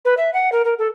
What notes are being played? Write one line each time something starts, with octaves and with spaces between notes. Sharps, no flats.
B4
E5
F#5
A#4
A#4
A4